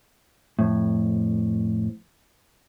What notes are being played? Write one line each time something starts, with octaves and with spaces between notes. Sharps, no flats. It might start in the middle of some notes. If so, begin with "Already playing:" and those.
F2 A2